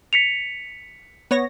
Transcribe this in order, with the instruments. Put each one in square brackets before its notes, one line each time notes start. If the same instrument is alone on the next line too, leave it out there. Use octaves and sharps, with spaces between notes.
[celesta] B6 C#7 F7
[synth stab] B3 C#5 A#6